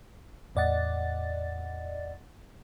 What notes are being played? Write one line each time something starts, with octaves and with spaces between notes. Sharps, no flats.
E2 A2 D5 D#5 F#5 A6